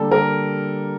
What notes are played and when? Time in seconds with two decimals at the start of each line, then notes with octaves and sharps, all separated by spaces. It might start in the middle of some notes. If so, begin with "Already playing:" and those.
Already playing: D3 G3 A#3 A4
0.11 A#4